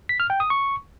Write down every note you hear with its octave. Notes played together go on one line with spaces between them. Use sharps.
B6
F6
G5
D#6
C#6